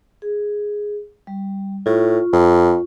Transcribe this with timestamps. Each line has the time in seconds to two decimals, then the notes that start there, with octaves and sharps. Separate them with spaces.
0.22 G#4
1.27 G3
1.86 A2 F4 C#6
2.32 F2